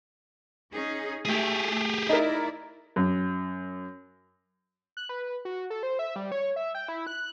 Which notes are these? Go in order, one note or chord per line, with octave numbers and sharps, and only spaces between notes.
C#4 D#4 G#4
A3 G4 G#4
D#4 E4 A#4 D5
F#2
F#6
B4
F#4
A4
C5
E5
G3
C#5
E5
G5
E4
F#6